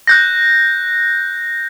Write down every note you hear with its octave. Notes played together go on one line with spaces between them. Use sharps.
F#6 G6 A#6